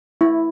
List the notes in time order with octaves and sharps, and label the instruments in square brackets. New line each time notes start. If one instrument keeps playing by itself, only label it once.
[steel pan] E4